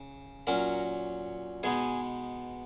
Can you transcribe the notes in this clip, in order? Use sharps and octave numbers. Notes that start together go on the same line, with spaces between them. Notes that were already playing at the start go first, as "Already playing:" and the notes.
Already playing: C#3
A#2 F#3 C#4 A#4 A#5
B2 G#3 B3 D#4 G#4 G#5